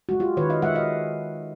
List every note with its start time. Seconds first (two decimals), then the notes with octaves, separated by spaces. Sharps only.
0.09 G#3 F#4
0.20 F4 G4
0.37 D#3 B4 C#5
0.50 D#5 F5
0.62 G#3 E5 F#5
0.75 D#5 F5